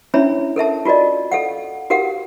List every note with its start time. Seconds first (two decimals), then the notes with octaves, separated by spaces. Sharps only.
0.14 C#4 D4 E4 C#5 E5 B5
0.56 A4 A#4 E5 A5
0.85 F4 F#4 A#4 D5 D#5
1.32 A4 F5 F#5
1.90 F#4 G4 A#4 F5 F#5